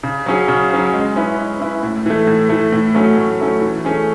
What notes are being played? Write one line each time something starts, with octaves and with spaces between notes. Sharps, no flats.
C#3
F#3 C#4 G#4
C#3
F#3 C#4 G#4
G#3
C#4 E4 B4
G#3
C#4 E4 B4
A2
E3 A3
A2
E3 A3
A2
F#3 A3 C#4
A2
F#3 A3 C#4
E3
A3 C#4 G#4